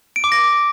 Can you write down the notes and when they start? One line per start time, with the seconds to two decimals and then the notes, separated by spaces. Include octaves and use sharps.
0.16 D7
0.24 D6
0.32 A#6